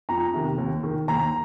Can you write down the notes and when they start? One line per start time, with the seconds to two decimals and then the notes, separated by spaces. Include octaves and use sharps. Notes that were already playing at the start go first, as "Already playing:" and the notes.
0.09 F2 A#5
0.34 C3 D#3
0.58 D#2
0.83 D#3
1.08 D#2 A#5